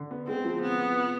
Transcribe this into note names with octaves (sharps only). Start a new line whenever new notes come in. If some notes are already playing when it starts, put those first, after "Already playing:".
Already playing: D3
B3
G#3 C4
F3
C3 B3
C3
F4